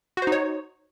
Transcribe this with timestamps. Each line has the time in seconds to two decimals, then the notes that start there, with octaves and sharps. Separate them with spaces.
0.17 F#4
0.22 C5
0.27 D#4
0.32 C#5